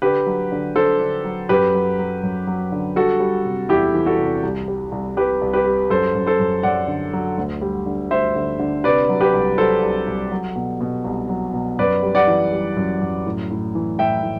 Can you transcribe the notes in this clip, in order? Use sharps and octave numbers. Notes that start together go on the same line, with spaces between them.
D3 G4 B4
F#3
D3
D3 A4 C5
D3
F#3
F#2 G4 B4
F#3
F#3
F#2
F#3
D3
G3 F#4 A4
G3
C3
E2 E4 G4
E3
F#4 A4
C3
C2
G3
C2
C2 G4 B4
C2
G4 B4
G3
F#2 A4 C5
F#2
A4 C5
F#2
F#2 D5 F#5
D3
F#3
D2
G3
D3
D2 C5 E5
D3
D3
C3 B4 D5
F#3
G4 B4
C2
F#3 A4 C5
C2
C2
F#3
B2
B2
C2
F#3
B2
F#2 B4 D5
G3
D5 F#5
E3
G3
F#2
F#2
A2
A2
E3
A2 E5 G5
A2